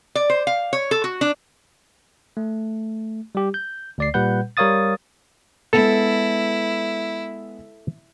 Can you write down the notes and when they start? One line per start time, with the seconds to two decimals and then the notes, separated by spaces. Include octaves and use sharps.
0.15 D5
0.30 C5
0.47 F5
0.73 C#5
0.91 A4
1.04 F#4
1.21 D4
2.37 A3
3.35 G3 G4
3.54 G6
3.98 D2 D5 C7
4.14 A#2 G3 B4 F#5 G6
4.57 G3 A#4 C#5 F5 D#6 A6
5.73 G#3 B3 E4 A4